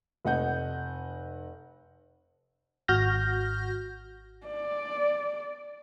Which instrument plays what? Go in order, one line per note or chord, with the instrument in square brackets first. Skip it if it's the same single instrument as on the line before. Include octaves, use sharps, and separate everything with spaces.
[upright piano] F1 D#5 F#5 G6
[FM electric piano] G#1 F#4 F6 G6 A#6
[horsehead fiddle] D5